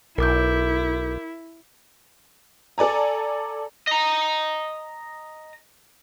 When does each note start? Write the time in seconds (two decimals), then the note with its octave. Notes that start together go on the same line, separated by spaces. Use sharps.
0.18 B1 E4 A#4 D6 G6
2.78 A4 D5 G#5 A#5
3.87 D#5 A#5